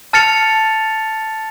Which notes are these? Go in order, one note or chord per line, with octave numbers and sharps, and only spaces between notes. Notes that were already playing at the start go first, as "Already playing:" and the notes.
A5 F6 A6 C#7 F7